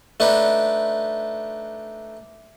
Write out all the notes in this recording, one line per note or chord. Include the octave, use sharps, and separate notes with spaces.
A3 D4 D#4 B4